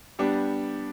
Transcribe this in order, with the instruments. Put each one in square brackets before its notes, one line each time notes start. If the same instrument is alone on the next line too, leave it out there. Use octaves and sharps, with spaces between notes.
[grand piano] G3 B3 D4 G4